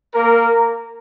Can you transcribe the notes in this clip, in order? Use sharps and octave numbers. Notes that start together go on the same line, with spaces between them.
A#3 A#4